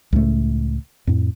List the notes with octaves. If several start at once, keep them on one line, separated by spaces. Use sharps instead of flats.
C#2 A2 A3
F2 A2